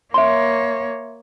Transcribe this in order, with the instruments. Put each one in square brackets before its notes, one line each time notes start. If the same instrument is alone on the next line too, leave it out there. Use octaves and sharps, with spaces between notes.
[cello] A#3 C#5 [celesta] E5 C6